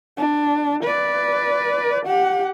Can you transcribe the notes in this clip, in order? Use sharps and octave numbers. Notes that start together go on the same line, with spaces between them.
D4
B4 D5
G4 F#5